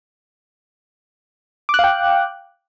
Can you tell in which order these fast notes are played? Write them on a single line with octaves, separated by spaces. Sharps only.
D6 F#6 F5 G5